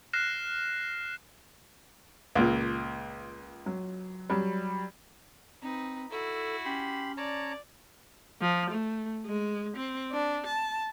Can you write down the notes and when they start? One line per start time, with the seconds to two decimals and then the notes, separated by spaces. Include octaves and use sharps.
0.13 F6 F#6 A#6 C7 E7
2.35 C#2 A#2
3.66 F#3
4.30 F#3 G3
5.62 C4 D#4 B4
6.11 E4 F#4 A4
6.65 C#4 G4 B5 C6
7.17 C#5 D5 A5 A#5
8.41 F3
8.70 A3
9.26 G#3
9.76 C4
10.12 D4
10.46 A5